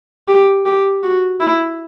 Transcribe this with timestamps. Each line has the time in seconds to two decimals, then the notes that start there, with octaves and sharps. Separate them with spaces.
0.28 G4
0.66 G4
1.03 F#4
1.40 E4